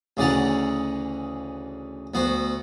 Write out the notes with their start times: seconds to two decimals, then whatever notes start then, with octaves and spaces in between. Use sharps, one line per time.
0.17 D2 C#3 E3 D5 F#5 A#5
2.14 D2 B3 F#4 C5